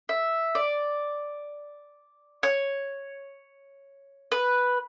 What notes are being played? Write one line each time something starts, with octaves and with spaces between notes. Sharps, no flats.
E5
D5
C#5
B4